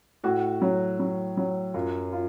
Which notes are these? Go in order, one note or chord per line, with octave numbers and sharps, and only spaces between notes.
A2 F#4
F#3
F#3
F#3
F#2 F4
F4